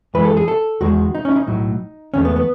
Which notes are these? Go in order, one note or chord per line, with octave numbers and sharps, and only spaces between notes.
F#2 E3 G#3 B4
A4
G#4
A4
E2 D#3 G#3 F#4
D#4
C#4
E4
D#4
B1 A2 F#3
E2 D#3 A3 C#4
B3
B3